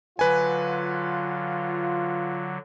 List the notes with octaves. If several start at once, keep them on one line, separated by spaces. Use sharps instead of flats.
D3 F#3 F4 B4 G#5